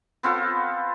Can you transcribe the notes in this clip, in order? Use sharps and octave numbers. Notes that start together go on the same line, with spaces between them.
B3 C4 F4 A4